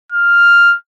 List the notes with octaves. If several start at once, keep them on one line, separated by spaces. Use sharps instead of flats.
F6